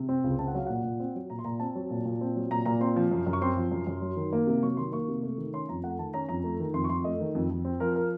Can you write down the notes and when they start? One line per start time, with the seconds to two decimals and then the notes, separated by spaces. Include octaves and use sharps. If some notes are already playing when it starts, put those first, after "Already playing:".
Already playing: C3
0.09 C4
0.24 C#2
0.39 C4 A5
0.48 F#5
0.55 F#3 F5
0.67 A#2 F#5
0.84 A#2
1.00 C4
1.15 F#3
1.30 A#2 A#5
1.39 C6
1.44 A#2 A#5
1.59 C4 A5
1.75 F#3
1.90 A#2
2.05 A#2
2.21 C4
2.36 F#3
2.51 A#2 A#5
2.66 A#2 A#5
2.80 C4 C6
2.96 F3
3.11 F#2
3.27 F#2
3.33 C#6
3.41 C4 C6
3.56 F3
3.71 F#2
3.87 F#2
4.02 F#3
4.17 D#3
4.33 A#3
4.47 C3
4.63 F#3 C#6
4.77 D#3 C6
4.92 A#3 C#6
5.08 C3
5.23 A3
5.38 D#3
5.53 C#4 C6
5.69 F2 A#5
5.83 A3 F#5
5.99 D#3 A5
6.14 C#4 A#5
6.29 F2 A#5
6.44 A3
6.60 D#3
6.74 F2 C6
6.84 C#6
6.89 F2 C6
7.04 A3 D#5
7.20 D#3
7.35 F2
7.50 F2
7.65 C4
7.80 F3 A#4
7.96 A#4